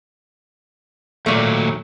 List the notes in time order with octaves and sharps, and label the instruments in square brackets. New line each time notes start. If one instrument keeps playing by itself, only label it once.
[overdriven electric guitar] D#2 F#3 [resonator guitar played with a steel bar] A#2 A3